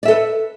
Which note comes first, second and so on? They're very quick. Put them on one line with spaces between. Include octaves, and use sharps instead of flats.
D5 E5 A4 B4